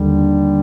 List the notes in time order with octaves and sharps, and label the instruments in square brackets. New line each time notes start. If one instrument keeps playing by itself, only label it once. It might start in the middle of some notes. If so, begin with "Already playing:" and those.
Already playing: [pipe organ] D#2 D3 G3